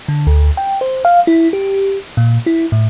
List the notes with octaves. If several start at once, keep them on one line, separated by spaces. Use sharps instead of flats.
D3
D2
G5
C5
F5
E4
G4
A#2
E4
A2